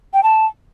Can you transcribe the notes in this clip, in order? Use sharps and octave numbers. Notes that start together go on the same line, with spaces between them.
G5
A5